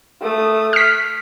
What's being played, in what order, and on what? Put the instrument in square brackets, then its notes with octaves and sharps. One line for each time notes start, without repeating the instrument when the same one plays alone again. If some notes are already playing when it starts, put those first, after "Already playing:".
[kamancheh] A3 D#6
[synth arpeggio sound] F6 B6